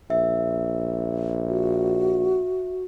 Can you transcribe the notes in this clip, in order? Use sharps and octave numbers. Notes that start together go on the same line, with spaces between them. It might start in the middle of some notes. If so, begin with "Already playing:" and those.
A#1 E5
F#4